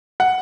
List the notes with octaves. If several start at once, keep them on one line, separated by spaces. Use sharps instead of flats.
F#5